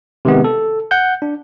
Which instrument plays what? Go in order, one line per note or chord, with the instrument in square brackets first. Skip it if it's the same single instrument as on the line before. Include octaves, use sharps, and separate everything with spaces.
[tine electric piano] C3 D#3 G#3 B3
A4
F#5 G6
D4